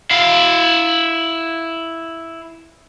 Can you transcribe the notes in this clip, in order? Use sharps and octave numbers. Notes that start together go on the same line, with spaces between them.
E4 F5